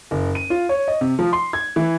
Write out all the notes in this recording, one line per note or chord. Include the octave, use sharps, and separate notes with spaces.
F#1
D#7
F4
C#5
D#5
C3
F3
C6
G#6
E3